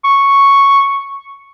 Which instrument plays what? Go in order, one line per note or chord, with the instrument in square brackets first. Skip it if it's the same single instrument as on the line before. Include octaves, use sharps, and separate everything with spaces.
[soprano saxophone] C#6